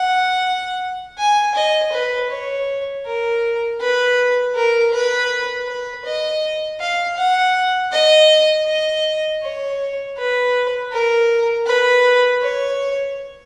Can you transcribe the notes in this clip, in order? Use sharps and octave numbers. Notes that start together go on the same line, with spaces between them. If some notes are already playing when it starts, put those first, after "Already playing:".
Already playing: F#5
G#5
D#5
B4
C#5
A#4
B4
A#4
B4
B4
D#5
F5
F#5
D#5
D#5
C#5
B4
A#4
B4
C#5